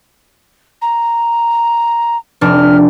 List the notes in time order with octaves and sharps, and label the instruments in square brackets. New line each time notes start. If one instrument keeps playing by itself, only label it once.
[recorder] A#5
[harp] F1 D4 [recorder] F6